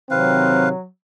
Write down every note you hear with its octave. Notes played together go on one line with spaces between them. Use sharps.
C3 D#3 F#3 C4 B4 F5